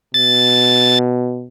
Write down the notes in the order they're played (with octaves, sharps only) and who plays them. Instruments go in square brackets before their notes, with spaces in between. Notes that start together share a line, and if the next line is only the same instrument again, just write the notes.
[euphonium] B2 [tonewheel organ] A6